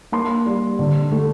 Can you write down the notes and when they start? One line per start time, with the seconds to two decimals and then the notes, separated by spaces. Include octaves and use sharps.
0.12 A#3 C6
0.46 G3
0.79 D3
1.12 A3